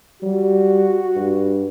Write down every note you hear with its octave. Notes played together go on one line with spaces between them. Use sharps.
G3 F#4
G2